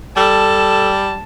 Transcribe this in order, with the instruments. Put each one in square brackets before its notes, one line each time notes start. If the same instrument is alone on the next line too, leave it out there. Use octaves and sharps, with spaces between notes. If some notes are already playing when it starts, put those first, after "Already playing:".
[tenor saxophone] G3 [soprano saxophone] A4 [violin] A5